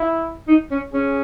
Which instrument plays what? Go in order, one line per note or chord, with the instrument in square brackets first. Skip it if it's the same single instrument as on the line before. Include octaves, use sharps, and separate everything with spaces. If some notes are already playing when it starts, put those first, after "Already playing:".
Already playing: [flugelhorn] E4
[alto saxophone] D#4
C#4
[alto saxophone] C#4 [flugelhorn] G#4